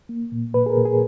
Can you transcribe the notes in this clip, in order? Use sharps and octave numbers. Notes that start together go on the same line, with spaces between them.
A#3
A#2
A#2 B4
G#4
A#4
A#2
G#4